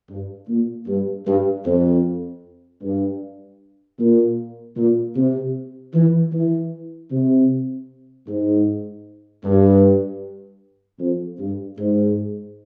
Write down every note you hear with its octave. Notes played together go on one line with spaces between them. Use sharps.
G2
A#2
G2
G2
F2
G2
A#2
A#2
C3
E3
E3
C3
G#2
G2
F2
G2
G#2